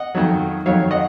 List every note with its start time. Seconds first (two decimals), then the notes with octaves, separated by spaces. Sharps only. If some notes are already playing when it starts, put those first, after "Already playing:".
Already playing: D#5 F#5
0.15 F2 D#3 F#3
0.66 F2 D#3 F#3 C#5 F5
0.91 D#5 F#5